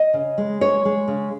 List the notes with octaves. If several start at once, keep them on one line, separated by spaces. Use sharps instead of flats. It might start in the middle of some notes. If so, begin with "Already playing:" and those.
Already playing: D#5
C#3
G#3
G#3 C#5
G#3
C#3